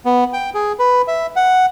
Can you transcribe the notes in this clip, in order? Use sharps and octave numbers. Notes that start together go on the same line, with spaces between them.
B3
G5
G#4
B4
E5
F#5